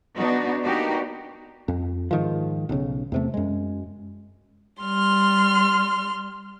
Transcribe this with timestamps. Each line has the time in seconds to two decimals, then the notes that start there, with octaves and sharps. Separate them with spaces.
0.16 B3 D4 D#4 F#4
0.64 A#3 B3 D4 D#4 F#4 G4
1.68 F2
2.11 G#2 D#3 F3
2.69 B1 C#3
3.12 E2 C3 A3
3.34 F#2 G#3
4.81 G3 C6 F6